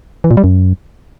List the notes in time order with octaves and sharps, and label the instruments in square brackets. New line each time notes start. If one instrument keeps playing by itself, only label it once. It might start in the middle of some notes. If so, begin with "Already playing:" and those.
[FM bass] E3
A#2
G3
F#2